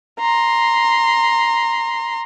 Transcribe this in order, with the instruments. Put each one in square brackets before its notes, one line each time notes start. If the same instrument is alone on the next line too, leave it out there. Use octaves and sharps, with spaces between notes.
[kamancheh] A#5 C6